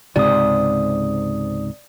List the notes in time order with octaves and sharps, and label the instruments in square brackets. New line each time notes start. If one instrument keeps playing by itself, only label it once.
[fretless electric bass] C#2 G#2 C3 [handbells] D5 D#6